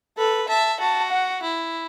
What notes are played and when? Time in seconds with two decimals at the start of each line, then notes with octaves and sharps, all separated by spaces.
0.18 A4 B4
0.49 E5 A5
0.80 F#4 A5
1.11 F#5
1.42 E4